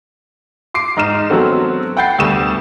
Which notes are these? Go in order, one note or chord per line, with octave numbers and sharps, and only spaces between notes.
C6 D6 C7 D7
G#2 D#4 F6 E7
F#3 A3 B3 C4 F#4 A4
F#5 G5 B5 G6 A6 C7
D2 G3 B3 A4 C#6 E7